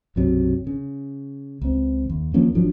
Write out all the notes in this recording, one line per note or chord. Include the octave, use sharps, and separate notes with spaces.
B1 F#2 C3 F#3
C#3
C#2 C4
D#2
D#2 F3 A#3 C#4
G#1 F3 F#3 D4